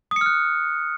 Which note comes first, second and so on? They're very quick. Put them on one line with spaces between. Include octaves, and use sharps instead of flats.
D#6 C#7 F6 F#6